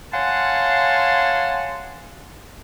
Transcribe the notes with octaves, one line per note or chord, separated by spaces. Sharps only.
C#5 F5 F#5 G#5 A5 C6